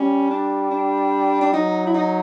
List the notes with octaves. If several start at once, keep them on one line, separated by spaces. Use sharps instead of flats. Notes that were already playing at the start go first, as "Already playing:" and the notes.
Already playing: G3 C#4
D4
D4
D4
F#3 D#4
E4
D#4